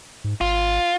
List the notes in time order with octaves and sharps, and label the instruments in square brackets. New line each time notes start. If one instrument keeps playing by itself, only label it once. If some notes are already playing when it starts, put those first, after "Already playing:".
[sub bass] G#2
[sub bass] G#1 [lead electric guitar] F4